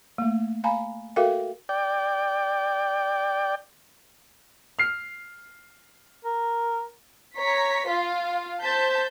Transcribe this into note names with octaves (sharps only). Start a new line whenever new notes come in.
A3 A#3
F5 G#5 A#5 B5
F#4 A4 A#4 E5 F5 G5
D5 G5
F6 C7
A#4
C#5 A#5 B6
F4 F5
C5 A5 G6 B6